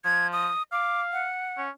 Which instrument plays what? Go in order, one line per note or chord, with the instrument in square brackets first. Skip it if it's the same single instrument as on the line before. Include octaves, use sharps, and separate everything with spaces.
[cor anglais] F3 [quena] G#6
[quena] D#6
[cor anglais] F5 [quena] D6
[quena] F#5
[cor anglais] C#4